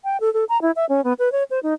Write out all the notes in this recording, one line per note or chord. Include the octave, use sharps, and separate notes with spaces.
G5
A4
A4
A#5
E4
E5
C#4
B3
B4
C#5
C5
D#4